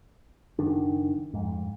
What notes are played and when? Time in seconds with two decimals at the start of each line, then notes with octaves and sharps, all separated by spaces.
0.59 F#1 D#3 D4
1.34 F2 G#2